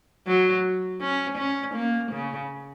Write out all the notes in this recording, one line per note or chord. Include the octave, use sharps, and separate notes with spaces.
F#3
C#4
C#4
A#3
C#3